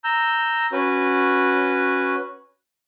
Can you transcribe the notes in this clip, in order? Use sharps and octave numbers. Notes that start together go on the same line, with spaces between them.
A#5 E6 G6
C#4 F#4 B4